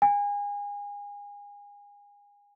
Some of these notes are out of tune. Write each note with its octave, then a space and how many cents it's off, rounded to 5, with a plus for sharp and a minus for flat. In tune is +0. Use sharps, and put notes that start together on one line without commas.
G#5 -30